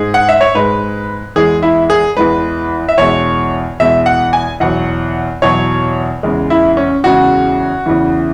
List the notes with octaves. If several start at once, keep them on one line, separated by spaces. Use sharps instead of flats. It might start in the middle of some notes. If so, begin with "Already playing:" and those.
Already playing: G#2 G#3 G#4
F#5
E5
C#5
G#2 G#3 B4
E2 E3 G#3 G#4
E4
G#4
E2 E3 G#3 B4
E5
E2 B2 G#3 C#5
E2 B2 G#3 E5
F#5
G#5
E2 B2 F#3 F#5
E2 B2 F#3 C#5
E2 C#3 G#3
E4
C#4
E2 C#3 G#3 F#4
E2 C#3 E3